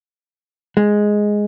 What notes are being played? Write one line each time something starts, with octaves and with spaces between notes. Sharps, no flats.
G#3